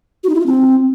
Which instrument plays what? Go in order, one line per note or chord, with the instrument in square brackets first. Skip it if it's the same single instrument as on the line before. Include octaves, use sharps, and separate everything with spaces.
[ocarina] F#4
D#4
E4
F4
C4